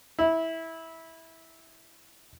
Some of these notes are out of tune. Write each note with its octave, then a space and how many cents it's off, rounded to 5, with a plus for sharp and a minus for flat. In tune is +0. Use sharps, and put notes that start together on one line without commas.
E4 -15